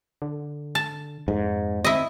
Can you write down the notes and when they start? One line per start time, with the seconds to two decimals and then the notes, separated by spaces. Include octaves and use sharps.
0.22 D3
0.75 A5
1.28 F2 G#2
1.84 C4 E4 D#5